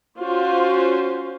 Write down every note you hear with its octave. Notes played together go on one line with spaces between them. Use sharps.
C#4 F4 F#4 C5